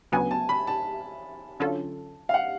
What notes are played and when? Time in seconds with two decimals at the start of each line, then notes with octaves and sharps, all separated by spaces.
0.12 D2 C#3 F#3 B3 F#4 G#5
0.31 A5
0.49 B5
0.67 A5
1.60 D3 F#3 C#4 F4 A4
2.29 F5
2.34 F#5